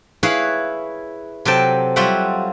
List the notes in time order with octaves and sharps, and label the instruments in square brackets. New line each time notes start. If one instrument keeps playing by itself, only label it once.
[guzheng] E4 G#4 B4 C#5 F5
C3 F#3 A4 G5 A5
F#3 G3 F4 F#4 E5 F#5